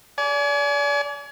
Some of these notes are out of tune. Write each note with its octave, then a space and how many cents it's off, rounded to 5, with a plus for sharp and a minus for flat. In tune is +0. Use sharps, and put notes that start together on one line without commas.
D5 -35 G#5 +30